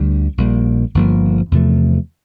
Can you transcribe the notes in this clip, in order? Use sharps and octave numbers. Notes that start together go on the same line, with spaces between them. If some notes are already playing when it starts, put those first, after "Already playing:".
Already playing: D2 D3 G3 D4
A#1 A#2 G3 A#3
G1 G2 F3 A#3
E2 C3 F3 A3